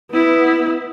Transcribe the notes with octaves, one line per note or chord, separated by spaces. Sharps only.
B3 E4